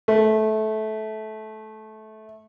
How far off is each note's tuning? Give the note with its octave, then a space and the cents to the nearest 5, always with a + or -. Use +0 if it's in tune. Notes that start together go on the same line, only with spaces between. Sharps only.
A3 -20